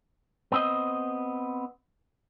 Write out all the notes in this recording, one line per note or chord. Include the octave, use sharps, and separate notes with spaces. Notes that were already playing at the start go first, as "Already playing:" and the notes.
B3 C4 D#5